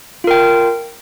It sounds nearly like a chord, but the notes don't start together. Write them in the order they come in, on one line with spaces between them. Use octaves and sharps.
F4 A#4 G5